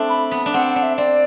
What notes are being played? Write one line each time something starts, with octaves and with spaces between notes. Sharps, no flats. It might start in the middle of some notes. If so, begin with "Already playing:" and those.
Already playing: A3 C4 D4
B5
B3
D4
C4 F#5
F#5
D4
E5
C4 D5